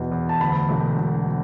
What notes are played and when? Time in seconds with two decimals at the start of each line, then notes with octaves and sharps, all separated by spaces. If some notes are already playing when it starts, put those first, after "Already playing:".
Already playing: E2 B2
0.12 E2
0.29 A5
0.41 D2 B5
0.69 E1
0.98 E1